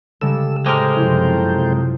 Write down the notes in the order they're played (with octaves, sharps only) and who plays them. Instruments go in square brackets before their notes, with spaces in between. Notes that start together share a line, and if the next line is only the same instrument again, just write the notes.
[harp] C#3 G3 G#3 [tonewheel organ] A4 E6
[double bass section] A2 [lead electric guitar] G#3 A#4 [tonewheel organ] A4 C5 G5 [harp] D6
[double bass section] F#2 C3 F3 [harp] C#4 E4 G4